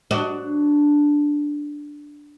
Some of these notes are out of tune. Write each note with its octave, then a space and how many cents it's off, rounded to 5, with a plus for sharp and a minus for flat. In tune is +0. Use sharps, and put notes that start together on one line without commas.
D4 +0 F#4 +10 D#5 +25